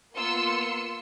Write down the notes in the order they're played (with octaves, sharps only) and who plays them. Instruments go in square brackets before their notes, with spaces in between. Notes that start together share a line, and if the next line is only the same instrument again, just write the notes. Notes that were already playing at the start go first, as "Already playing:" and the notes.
[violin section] A#3 B3 F4 C6 E6 C#7